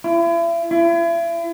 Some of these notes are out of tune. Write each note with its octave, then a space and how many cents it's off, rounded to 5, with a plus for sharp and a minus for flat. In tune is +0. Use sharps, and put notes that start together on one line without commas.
E4 +40
E4 +40